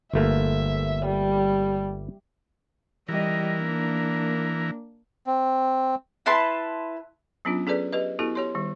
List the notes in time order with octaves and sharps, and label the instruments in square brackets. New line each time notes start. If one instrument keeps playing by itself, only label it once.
[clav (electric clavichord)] G1 A3 A#3 [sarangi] E5
[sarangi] G3
[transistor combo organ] E3 A#4 [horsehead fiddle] G3 D#5
[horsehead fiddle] A#3 D4
[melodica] C4
[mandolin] E4 B4 A5 C6
[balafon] F#3 B3 C#4 D4 F4
C#4 G#4 A4 B4 D5
G4 B4 D#5
B3 E4 F#4 G4 A4
G4 C#5 C6
D#3 G3